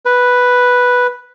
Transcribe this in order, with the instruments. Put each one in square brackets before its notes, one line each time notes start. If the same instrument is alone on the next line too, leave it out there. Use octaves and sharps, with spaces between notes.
[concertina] B4